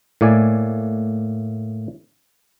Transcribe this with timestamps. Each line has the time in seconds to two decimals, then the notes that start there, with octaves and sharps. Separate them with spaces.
0.21 A2 A#3 D5 G#5